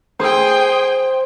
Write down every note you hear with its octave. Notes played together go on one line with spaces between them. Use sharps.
G#4 C5 G5